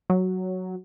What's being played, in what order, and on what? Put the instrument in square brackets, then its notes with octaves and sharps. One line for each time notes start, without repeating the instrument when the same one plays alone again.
[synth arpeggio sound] F#3